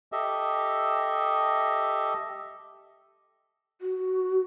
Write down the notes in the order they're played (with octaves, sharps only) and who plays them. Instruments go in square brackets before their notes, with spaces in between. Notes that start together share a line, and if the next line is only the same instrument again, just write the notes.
[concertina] G4 A4 D#5 E5
[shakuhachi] F#4